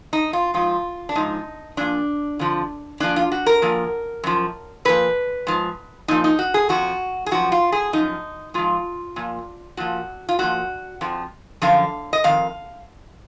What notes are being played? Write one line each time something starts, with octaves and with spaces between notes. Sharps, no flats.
D#4
F4
G#2 F3 F4
D4
G#2 F3 D#4
A#2 F3 D4
F2 D3 F3
A#2 F3 D4
F4
F#4
A#4
A#2 F3
F#2 F3
A#2 F3 B4
G#2 F3
A#2 F3 D#4
D#4
F#4
G#4
F2 F3 F#4
G#4
F#2 F3 F#4
F4
G#4
F#2 F3 D#4
G#2 F3 F4
A#2 F3
A#2 F3 F#4
F4
A#2 F3 F#4
F2 F3
F#2 D3 F3 F5
D#5
F2 D#3 F5